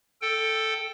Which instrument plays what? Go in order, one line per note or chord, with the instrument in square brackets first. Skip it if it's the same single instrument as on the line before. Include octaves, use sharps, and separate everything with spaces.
[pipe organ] A4 G5